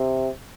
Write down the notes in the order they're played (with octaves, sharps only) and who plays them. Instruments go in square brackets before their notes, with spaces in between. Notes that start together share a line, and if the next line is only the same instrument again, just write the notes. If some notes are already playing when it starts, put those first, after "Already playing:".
Already playing: [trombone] C3